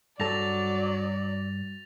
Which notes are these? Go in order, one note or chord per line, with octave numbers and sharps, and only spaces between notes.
G2 F#3 A4 D5 A6 A#6 F7